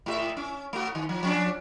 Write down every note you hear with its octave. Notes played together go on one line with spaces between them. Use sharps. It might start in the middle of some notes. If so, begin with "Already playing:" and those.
A2 G4 E5
C#4
A3 F#4
D#3
F3
F3 C#4 D4